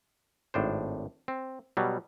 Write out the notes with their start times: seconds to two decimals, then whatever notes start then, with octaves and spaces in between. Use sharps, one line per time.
0.54 G#1 A2 D4 C5
1.28 C4
1.77 B2 F#3 G3